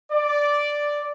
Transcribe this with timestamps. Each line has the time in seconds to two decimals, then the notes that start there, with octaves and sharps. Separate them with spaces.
0.11 D5